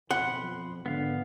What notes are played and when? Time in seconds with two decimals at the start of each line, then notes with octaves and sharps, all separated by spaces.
0.11 F2 B2 F#5 B5 C6
0.43 F3
0.86 G#1 D3 B3 F5